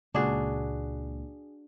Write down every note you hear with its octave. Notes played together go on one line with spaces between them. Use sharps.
C#2 A#2 D4 F#4 G#4